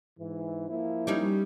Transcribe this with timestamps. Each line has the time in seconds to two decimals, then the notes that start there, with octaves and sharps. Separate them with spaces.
0.19 G#2 E3
0.69 F3 A#3 E4
1.07 G3 C#4 D#4